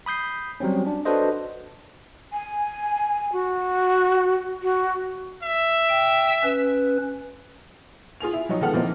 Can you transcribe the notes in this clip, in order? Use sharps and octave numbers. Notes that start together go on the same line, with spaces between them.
B5 D#6 G6 C7
F#3 G3 C4 C#4
D4
D4 F#4 A4 B4 C5 D#5
G#5
F#4
F#4
E5
G5
C#4 B4
F4 G#4 G#5 F7
E4
F3 F#3 D#4 C#5
D#3 G#3 B3 A4 F#5 F6
E3 F3 A#3 C4 D#4 A#4